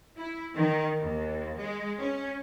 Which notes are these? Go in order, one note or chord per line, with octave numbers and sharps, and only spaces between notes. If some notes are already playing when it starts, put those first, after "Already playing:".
E4
D#3
D#2
G#3
C#4